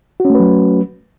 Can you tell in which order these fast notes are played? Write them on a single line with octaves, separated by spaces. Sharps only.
F#4 C#4 A3 B4 F#3